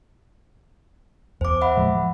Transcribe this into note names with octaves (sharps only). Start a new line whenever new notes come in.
E2 C5 D6
E5 F#5 B5
A2 F3 G#3
F3